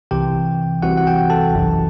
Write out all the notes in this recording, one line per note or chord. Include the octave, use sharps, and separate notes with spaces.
C2 C3 E3 G4 G5
C2 C3 E3 F#4 F#5
F#5
G4 G5
A4 A5
G1 F#2 E3